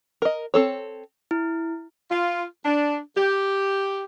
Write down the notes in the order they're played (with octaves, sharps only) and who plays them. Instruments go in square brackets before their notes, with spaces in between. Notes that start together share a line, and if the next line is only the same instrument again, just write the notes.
[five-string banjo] A#4 D#5
C4 A4 C#5
[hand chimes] E4
[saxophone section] F4
D4
G4